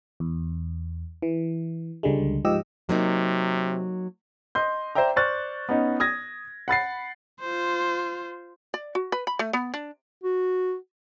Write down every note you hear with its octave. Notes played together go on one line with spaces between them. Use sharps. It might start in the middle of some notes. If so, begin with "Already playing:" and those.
E2
E3
C#2 D3 G3 G#3
G#2 F3 G4 D#5 E6
C3 F#3 A#3 D#4
D#5 C6 G6
C5 D5 E5 G5 A#5
C5 D5 C#6 F6 F#6 A6
B3 C#4 D#4
D#6 G#6 A#6
F#5 B5 A6 C7
F4 C5
D5
F#4
B4
B5
A3
B3
D4
F#4